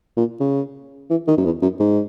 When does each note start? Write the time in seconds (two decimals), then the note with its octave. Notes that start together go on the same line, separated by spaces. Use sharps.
0.17 A#2
0.40 C#3
1.10 E3
1.27 D#3
1.37 F#2
1.45 E2
1.62 F#2
1.80 G#2